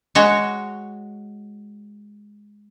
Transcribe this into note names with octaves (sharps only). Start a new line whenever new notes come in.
G#3 F#4 C#5